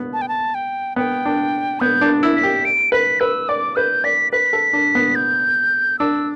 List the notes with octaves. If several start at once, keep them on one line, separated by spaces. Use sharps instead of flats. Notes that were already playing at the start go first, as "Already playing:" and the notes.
Already playing: B3
A5
G5
A5
G5
B3 G5
D4
B3 G6
D4
E4
B6
G4
D7
B4 B6
B4 E6
D5 D6
B4 G6
D5 B6
B4 B6
A4
D4
B3
G6
D4 E6